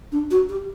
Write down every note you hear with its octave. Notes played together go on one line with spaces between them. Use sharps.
D4
F#4
G4